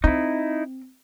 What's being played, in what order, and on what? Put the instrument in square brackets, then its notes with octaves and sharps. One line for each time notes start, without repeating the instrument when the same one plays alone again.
[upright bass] C4 [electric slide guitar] D#4 E4